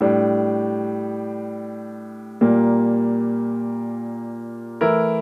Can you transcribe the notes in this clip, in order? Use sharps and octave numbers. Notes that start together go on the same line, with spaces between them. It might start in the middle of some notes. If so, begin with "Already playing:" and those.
A2 G3 D4
A#2 G3 A#3
E3 A3 E4 A#4